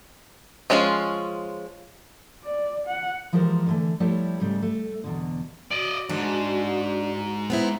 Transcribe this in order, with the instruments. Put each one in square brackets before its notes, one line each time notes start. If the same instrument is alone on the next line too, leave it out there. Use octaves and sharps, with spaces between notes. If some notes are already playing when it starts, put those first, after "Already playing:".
[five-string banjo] F3 G#3 C#4 E4 F4
[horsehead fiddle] D5
F#5
[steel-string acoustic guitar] E3 F3 G#3 G4 A#4 C5
D3 E3 A3
F3 G3 A3 E4 G4 C#5
G#2 C#3 G3 A3
A3
E2 B2 D3
[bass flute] F#4 [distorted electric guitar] D5 D#5
[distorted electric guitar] E2 G#2 [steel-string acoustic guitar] D4
[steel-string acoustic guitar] B3 C4 E4